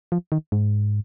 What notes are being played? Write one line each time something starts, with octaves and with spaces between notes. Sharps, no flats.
F3
D#3
G#2